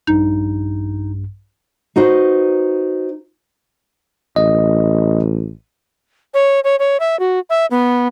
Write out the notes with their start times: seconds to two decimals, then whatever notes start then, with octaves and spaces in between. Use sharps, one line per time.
0.07 A#1 G2 D#4
1.96 D#4 F#4 B4 C5
4.36 A1 D#5
6.34 C#5
6.64 C#5
6.79 C#5
7.00 E5
7.19 F#4
7.50 E5
7.71 B3